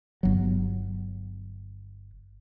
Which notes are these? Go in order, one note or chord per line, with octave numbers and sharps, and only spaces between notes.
G1 F#3